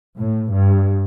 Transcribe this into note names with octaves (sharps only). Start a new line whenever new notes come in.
A2
G2